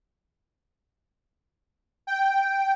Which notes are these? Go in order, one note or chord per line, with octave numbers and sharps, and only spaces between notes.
G5